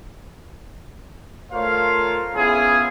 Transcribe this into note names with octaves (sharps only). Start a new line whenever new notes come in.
A3 F4 A#4 C5 C#5 F5
B3 C#4 E4 F4 G#4